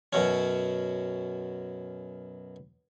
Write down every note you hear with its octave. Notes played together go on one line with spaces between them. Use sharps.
F#2 B2 C#4